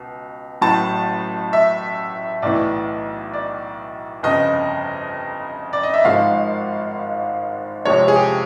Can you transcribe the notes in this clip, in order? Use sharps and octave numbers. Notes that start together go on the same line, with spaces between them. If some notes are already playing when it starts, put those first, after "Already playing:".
Already playing: C#2 B2
A1 A2 F#3 A5
E5
B1 A2 E3 D5
D5
G1 F2 C#3 D#5
D5
D#5
E5
G#1 G#2 F3 G#3 F5
F2 C3 F3 G#3 C#5
G#4
G4